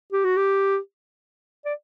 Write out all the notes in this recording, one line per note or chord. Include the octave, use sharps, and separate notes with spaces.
G4
F#4
G4
D5